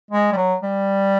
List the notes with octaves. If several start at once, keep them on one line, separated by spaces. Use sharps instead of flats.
G#3
G3
F#3
G3